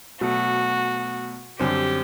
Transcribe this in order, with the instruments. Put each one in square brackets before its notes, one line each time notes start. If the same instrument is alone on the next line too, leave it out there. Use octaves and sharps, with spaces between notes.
[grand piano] B2 F#3 A3 [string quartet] F#4
[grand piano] F#2 D3 G3 C4 [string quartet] G4